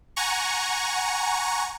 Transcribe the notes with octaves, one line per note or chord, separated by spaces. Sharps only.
F#5 G#5 A#5 C#6